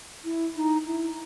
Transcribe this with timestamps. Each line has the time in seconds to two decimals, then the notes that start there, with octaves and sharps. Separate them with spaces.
0.24 E4
0.56 D#4
0.87 E4